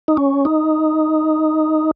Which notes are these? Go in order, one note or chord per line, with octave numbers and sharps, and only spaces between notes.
D#4
C#4
D#4